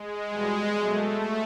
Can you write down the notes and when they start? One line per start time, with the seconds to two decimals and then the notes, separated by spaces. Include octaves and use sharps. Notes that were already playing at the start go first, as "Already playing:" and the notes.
Already playing: G#3
0.28 E2 B2 G3
0.75 B2 F#3 A3